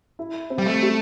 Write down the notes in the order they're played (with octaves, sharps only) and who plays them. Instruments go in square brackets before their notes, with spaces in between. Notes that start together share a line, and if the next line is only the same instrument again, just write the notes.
[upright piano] E4
C4
[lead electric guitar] G3
A3
[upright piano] G3